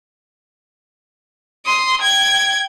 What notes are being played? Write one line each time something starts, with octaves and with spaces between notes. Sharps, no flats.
C6 D#6
G5 G#6